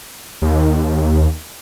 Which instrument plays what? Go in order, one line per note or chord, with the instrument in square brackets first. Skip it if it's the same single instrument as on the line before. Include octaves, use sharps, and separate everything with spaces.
[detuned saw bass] D#2